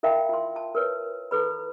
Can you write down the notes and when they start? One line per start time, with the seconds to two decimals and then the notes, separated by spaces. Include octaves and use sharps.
0.03 E4 A#4 E5 F5 G5 B5
0.29 F4 C6
0.56 A5
0.75 A#4 B4 C#5
1.31 E4 A4 B4 B5